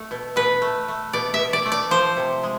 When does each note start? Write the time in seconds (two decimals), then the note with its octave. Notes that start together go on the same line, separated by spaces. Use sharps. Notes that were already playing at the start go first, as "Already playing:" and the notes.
Already playing: A3 A4
0.11 B2
0.36 B2 B4
0.62 A3
0.88 A3
1.13 B2 D5
1.34 E5
1.39 B2
1.53 D5
1.66 A3
1.72 D5
1.91 F3 C5
2.17 C3
2.43 G#3